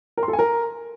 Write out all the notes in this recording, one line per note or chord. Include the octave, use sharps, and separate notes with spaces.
A#4
C6
A4
G#5
A#4